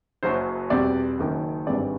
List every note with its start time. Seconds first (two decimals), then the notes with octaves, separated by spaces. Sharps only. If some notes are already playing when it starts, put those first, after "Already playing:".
0.23 F#1 F#2 C#3 F#3 C5
0.70 E2 B2 G3 C4 D5
1.19 F#1 F#2 D#3
1.67 G#1 G2 E3 G#3 C4 D5